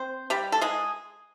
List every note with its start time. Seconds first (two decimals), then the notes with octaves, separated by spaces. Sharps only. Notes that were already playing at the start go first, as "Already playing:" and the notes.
Already playing: C4 C5
0.30 G3 G4
0.52 A4
0.61 G#3 G#4